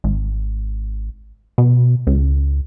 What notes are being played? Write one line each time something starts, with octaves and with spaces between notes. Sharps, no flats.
G#1
B2
C#2